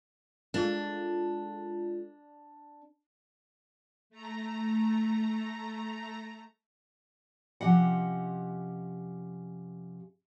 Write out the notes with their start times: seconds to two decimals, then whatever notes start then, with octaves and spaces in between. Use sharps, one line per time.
0.54 G#3 D4 F4 A4
4.10 A3 A#5
7.61 C3 F3 C#4 G4 D#5 F#5